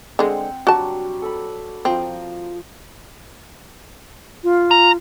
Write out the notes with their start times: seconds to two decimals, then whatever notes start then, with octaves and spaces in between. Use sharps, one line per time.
0.19 D3 G#3 C4 F#5
0.67 F#3 G3 D4 F#4 A5
1.22 A4 B5
1.85 F3 C4 D#5 A#5
4.44 F4
4.71 A#5